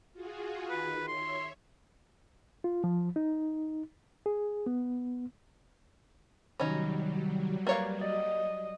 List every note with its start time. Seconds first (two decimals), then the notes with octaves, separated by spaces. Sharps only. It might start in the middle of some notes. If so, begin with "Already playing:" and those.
0.13 F4 F#4 G#4
0.70 D#3 B4
1.08 C#5 E5 C6
2.64 F4
2.84 F3
3.16 D#4
4.26 G#4
4.66 B3
6.60 C2 D#3 F#3 G3 C#4 D#4 B5
7.67 A#3 B4 C#5 D5 F5
8.01 D5 D#5